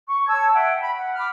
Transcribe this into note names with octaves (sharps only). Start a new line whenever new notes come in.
C#6
C#5 A5 E6 G#6
E5 F#5 G5
B5
F#5
B5 D6 F6